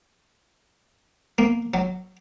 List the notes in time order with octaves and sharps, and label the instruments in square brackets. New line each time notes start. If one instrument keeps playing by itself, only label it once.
[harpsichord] A#3
F#3